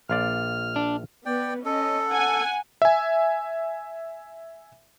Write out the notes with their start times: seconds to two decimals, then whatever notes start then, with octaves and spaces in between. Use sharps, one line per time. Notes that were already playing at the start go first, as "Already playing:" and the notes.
0.09 A#1 F4 D5 F6
0.76 D4
1.26 B3 B4 D5 G5
1.65 C#4 A4 D#5
2.09 F#5 G#5
2.82 E5 G#5